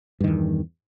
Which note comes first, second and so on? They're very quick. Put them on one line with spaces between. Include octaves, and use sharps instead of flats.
G2 D#3 E2